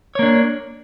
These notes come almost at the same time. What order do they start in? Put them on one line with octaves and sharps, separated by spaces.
C#5 A#3 D4